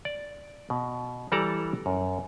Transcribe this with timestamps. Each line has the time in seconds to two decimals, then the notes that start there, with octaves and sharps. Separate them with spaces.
0.05 D5
0.70 B2
1.32 E3 G3 A4 D5 A5 A#5
1.86 F#2